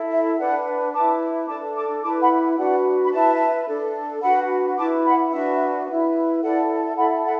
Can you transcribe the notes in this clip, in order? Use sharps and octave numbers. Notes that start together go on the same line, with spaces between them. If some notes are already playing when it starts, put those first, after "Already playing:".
Already playing: E4 A4
E5
D4 B4 D5 F#5
E4 B4 A5 D6
D4 A4 A5 D6
A5 D6
E4 B4 A5 D6
F#5 B5
D4 F#4 B4 D5 F#5
B5
E4 B4 E5 A5
D4 A4
D4 F#4 B4 F#5 B5
E4 B4 A5 D6
F#5 B5
D4 F#4 B4 E5
E4 B4
E4 A4 D5 F#5
E4 A4 F#5 B5
F#5 B5